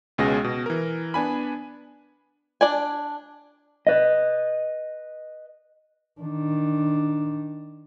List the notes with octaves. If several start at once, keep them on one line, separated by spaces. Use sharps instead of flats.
C#2 B2 G#3 C#4 G#4 A#6
B2
E3 A#4
B3 D4 G#5 B5
D4 D5 G#5
B4 D#5
D#3 D4